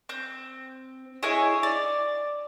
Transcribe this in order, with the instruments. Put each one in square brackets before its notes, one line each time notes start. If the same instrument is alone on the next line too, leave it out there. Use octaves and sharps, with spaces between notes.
[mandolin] C4 G6
E4 G#4 C#5 D#5
D5